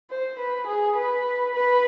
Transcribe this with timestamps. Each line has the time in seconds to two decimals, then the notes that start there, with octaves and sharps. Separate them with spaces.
0.10 C5
0.39 B4
0.67 G#4
0.96 B4
1.55 B4